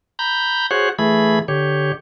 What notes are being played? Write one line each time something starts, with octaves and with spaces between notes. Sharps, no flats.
A#5 B5 G6
F#4 G#4 C5 C#5 F#5
E3 A3 G#4 B5
D3 G4 C#5